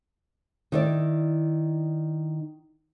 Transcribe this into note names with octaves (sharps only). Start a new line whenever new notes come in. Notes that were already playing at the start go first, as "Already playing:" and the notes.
D#3 E4 D5